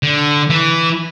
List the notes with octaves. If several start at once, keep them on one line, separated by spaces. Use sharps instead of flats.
D3
E3